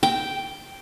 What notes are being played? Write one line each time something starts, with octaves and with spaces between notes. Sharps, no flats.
G5